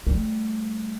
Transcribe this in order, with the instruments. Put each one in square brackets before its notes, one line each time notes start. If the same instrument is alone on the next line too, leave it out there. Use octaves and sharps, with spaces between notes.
[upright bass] G3 A3